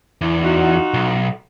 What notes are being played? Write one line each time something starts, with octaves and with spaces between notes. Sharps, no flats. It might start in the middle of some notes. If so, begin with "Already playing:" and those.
E2
D#4 F4 F#4
B1